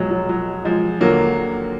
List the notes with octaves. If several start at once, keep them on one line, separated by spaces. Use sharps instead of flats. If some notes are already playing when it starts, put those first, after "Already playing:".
Already playing: B1 B2 F3 F#3 G#3
F#3
F#3
F3 G#3
D#2 D3 F#3 A#3